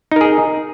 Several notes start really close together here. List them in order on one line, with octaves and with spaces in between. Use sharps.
D#4 A#4 G#4